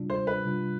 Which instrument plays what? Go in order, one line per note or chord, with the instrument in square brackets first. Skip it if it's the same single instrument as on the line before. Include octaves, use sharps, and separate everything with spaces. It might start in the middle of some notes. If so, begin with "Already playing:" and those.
Already playing: [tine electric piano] C3 G3 D4 F4
[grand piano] C5
B4
[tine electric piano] C3 G3 D4 F4